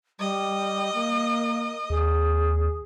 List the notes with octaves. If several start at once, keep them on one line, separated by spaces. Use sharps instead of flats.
G3 D#5
A#3
D#2 G#4